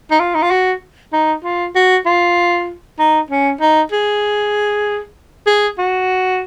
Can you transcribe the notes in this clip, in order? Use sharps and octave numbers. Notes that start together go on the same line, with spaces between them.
D#4
F4
D#4
F4
F#4
D#4
F4
F#4
F4
D#4
C#4
D#4
G#4
G#4
F#4